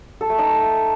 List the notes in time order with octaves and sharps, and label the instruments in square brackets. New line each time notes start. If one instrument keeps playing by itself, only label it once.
[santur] A4
A3
D#4